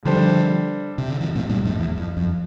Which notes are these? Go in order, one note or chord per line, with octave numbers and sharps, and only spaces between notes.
D3 F3 G3 D4 A4 C5
C3
D3
C3 E3
A2 C3
G2 A#2
F2 A2
E2
F2
F2